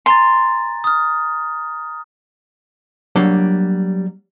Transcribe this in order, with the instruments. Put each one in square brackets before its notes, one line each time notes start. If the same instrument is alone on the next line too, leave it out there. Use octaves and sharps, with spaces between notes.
[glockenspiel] G#5 A#5 A6 [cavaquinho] C6
[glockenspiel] D#6 F6
[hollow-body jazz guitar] F#3 G3 A#3 D4 C#5